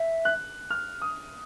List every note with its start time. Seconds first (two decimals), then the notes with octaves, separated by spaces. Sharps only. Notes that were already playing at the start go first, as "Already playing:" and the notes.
Already playing: E5
0.25 F#6
0.71 F6
1.02 D#6